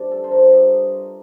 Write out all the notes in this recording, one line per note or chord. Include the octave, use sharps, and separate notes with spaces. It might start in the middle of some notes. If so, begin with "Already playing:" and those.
Already playing: G2 F3 D4
A4
C5
G2 F3 A#4
D#5